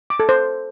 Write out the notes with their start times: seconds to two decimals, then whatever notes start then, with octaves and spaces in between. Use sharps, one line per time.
0.10 D6
0.20 A4
0.29 C5